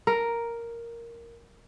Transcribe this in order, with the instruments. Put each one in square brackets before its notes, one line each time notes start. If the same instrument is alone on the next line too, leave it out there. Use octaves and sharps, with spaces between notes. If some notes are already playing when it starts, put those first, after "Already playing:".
[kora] A#4